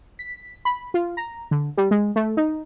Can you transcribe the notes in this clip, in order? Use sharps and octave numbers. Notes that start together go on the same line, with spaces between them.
B6
B5
F4
A#5
D3
G3
G#3
A3
D#4